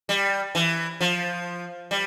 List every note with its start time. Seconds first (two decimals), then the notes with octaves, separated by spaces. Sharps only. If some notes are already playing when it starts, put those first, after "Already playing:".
0.09 G3
0.55 E3
1.01 F3
1.91 G3